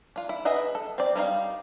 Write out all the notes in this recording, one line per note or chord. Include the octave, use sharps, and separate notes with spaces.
D4 F4
E4
G#4 B4 D#5 E5 F#5
A4
C4 D5
G3 A#3 D#4 F4 F5